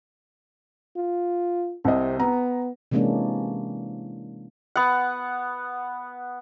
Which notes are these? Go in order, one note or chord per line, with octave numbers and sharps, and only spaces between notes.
F4
C2 C3 D#5
B3 A#5
C3 E3 G#3 A#3 C#4 D4
B3 F#5